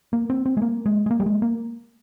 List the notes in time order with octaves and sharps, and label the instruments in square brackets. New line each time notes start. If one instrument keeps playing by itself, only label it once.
[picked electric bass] A#3
C4
C4
G#3
A#3
G#3
G#3
A#3
G3
G#3
A#3